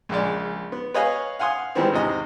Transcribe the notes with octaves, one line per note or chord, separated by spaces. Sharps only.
A#1 C#3 G#3 D5
B3
B4 C#5 D#5 F5 G#5
F5 F#5 G#5 C6 D#6
D#3 E3 G3 G#3 B3 C4
E2 G#2 C3 D#5